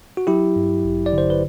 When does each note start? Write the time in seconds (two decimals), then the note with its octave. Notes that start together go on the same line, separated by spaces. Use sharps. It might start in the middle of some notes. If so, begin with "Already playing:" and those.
0.17 F#4
0.27 F#3 E4 G4
0.56 G2
0.84 A1
1.06 D5
1.13 D3
1.18 C5
1.30 B4